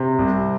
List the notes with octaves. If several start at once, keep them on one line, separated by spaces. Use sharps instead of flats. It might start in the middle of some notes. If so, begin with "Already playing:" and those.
Already playing: C3
C2